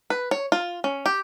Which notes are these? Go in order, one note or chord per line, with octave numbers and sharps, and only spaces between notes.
B4
C#5
F4
C#4
G4